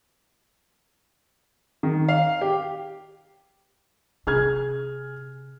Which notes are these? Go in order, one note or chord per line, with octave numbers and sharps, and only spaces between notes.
D#3
F5
G4
C3 C#4 G#4 F6 G#6